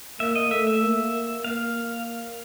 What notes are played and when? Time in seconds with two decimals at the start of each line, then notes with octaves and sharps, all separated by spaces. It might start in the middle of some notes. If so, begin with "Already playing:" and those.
0.20 A#3 E5
0.36 D#5
0.51 A3 E5
0.67 E5
0.82 A#3
1.44 A#3 F5